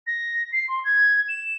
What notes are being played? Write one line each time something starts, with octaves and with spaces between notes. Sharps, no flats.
A#6
C7
C6
G#6
E7